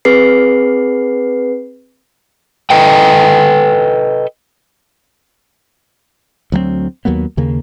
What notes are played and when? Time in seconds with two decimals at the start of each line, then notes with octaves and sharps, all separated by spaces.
0.05 C4 G#4 B4 C7
2.70 A4 B4 D#5 G5
6.52 D2 F#3 A#3 C4
7.05 D#2 F#3 A#3 B3
7.37 D#2 C#3 A#3